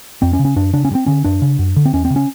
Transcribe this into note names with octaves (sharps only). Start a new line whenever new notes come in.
F2 C4
C#4
C#3
C#4
F#2 D4
C#3 D4
C#4
G2
C4
D3 C#4
F#2 D4
C#3
F#2
D3
C4
E2 C#4
C4
C#3
C#4